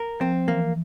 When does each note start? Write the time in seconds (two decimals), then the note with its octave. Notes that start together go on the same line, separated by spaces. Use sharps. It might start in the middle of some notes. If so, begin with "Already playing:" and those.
Already playing: A#4
0.20 F3 C4
0.48 E3 A#3